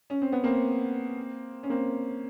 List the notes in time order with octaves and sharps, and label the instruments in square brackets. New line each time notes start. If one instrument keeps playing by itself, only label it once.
[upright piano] C#4
C4
B3
A#3 C4
C#4
A#3 C4